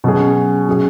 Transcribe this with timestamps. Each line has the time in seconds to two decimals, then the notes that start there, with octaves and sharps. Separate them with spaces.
0.04 B2 F#3 C#4 G#4
0.69 F#3 C#4 G#4